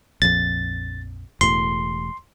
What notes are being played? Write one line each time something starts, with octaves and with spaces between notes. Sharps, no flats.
A#1 F2 A6
E1 A2 C6